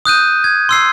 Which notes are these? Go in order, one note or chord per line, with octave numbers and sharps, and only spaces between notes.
D#6 F#6 G6 D#7
G#6
C6 E6 C7